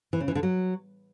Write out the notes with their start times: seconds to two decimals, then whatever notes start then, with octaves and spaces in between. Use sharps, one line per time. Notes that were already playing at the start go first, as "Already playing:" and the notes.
0.13 E3
0.20 C#3
0.28 E3
0.35 D3
0.43 F#3